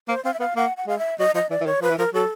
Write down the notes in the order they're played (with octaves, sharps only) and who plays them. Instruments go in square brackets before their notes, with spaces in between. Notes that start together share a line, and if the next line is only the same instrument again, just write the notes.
[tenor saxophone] A#3 [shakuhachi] C5
[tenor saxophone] C4 [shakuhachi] F5
[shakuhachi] E5
[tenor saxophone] B3 [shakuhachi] F5
[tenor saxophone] A#3 [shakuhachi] F#5
[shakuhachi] F#5
[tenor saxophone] G#3 [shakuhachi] F5
[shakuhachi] E5
[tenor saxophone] F#3 [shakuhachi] D#5
[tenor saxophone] F3 [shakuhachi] D#5
[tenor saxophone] E3 [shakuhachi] D5
[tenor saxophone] E3
[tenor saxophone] D#3 [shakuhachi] C#5
[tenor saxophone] F3 [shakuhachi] B4
[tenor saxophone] E3
[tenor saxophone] F3 [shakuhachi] A#4
[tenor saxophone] F#3 [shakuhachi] A4